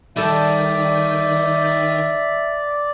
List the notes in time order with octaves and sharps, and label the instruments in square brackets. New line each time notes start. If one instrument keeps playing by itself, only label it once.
[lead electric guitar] D#3 [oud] G3 A4 [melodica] D5 [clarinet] E5